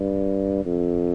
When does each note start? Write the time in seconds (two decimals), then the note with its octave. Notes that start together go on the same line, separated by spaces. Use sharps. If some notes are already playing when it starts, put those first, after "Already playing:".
Already playing: G2
0.65 F2